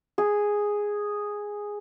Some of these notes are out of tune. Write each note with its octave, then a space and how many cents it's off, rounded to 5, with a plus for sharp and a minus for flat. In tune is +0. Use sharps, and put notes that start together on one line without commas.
G#4 -5